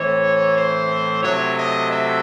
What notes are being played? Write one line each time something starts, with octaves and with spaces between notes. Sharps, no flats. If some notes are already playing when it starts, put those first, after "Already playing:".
Already playing: A2 E3 C4 C#5
C5
C3 F#3 A3 C#5
D#5
E5